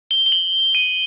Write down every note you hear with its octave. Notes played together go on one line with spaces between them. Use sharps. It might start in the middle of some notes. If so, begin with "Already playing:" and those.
G7
G7
F#7
D#7